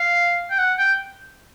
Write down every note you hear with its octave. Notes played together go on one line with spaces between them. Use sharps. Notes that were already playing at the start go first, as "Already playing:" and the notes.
Already playing: F5
G5
F#5
G5